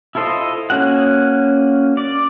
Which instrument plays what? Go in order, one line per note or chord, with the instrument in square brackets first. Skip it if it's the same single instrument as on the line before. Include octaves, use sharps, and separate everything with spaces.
[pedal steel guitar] E4 F4 A4 C5 D#5
A#3 C#4 F#4 F#5
D5